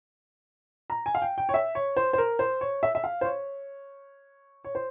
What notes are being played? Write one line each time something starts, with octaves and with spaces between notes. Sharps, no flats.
A#5
G#5
F5
G5
G5
C#5
E5
C#5
C5
C5
A#4
C5
C#5
E5
E5
F5
C5
C#5
C#5
C5